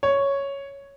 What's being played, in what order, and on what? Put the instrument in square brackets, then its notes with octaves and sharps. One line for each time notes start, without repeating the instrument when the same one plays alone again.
[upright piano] C#5